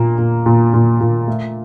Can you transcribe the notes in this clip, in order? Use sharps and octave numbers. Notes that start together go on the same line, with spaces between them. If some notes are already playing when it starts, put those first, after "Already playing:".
Already playing: A#2 A#3
A#2
A#2
A#2
A#2
A3